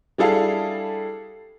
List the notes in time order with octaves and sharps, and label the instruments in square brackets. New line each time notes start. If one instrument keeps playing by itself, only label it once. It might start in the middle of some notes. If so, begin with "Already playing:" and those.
[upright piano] G3 D4 E4 G#4 A4 F5